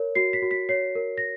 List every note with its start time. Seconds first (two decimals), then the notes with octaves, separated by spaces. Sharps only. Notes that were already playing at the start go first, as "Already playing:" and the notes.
Already playing: A#4 C#5
0.15 F#4 C7
0.33 B6
0.42 F#4
0.51 B6
0.69 C#5 C7
0.95 A#4
1.18 A#6